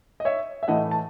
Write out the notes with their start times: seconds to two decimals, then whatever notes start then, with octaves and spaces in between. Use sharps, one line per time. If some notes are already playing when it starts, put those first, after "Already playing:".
0.20 D#5
0.25 C#5 E5
0.63 E5
0.68 A2 E3 A3 D#5 F#5
0.91 A5